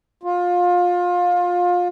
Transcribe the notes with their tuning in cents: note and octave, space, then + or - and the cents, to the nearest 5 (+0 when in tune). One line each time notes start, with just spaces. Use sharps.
F4 +25